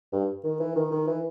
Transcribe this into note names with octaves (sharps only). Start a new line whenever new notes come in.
G2
D#3
E3
D#3
D#3
E3